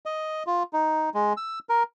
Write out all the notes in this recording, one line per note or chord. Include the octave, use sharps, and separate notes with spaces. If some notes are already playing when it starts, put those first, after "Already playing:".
D#5
F4
D#4
G#3
E6
A#4